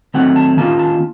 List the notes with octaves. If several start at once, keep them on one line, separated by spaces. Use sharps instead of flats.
D#3 F#3 A3 C4 F#5
A5
D#3 A#3 C#4 F4 A5
A5